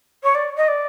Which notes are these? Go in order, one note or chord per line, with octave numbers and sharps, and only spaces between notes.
C#5
D5
D#5
D5